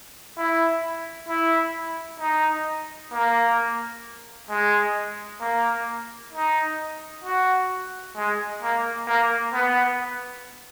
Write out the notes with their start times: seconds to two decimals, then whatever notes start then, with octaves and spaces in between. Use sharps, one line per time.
0.37 E4
1.29 E4
2.20 D#4
3.13 A#3
4.49 G#3
5.41 A#3
6.34 D#4
7.24 F#4
8.16 G#3
8.63 A#3
9.08 A#3
9.53 B3